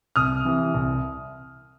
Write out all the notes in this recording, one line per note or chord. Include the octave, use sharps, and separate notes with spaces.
C2 D#6 F6
C3 E3
C2